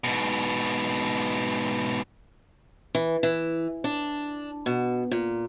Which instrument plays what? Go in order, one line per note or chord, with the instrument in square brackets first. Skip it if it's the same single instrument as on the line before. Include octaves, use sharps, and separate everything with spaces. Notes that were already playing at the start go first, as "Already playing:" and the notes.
[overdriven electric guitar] G#2 B2
[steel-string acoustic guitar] E3
E3
D4
B2
A#2